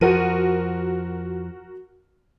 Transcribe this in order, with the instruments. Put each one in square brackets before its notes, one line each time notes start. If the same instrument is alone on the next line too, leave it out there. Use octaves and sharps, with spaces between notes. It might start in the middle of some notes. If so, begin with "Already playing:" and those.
[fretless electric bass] F2 F3 [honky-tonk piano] F#4 A#4 D#7